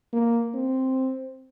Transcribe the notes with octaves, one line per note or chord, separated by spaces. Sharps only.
A#3
C4